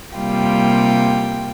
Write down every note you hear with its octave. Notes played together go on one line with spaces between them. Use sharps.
C3 G3 A#3 F4 G5